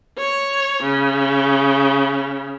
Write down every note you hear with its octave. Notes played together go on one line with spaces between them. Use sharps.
C#5
C#3